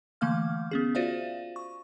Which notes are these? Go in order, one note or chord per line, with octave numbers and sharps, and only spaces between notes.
D3 E3 A3 A#3 F5 F6
B3 C#4 G#4
F4 F#4 C5 D5 E5 F5
C#6